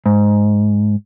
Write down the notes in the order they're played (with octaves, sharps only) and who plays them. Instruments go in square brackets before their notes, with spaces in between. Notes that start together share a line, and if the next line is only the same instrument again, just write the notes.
[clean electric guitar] G#2